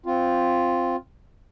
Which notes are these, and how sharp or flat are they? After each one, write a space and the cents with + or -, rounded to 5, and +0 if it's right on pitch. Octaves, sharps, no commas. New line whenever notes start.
C4 +0 F4 +0